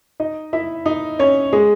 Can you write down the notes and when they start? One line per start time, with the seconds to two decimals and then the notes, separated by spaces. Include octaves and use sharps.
0.20 D#4 D#5
0.53 E4 E5
0.86 D#4 D#5
1.19 C#4 C#5
1.53 G#3 G#4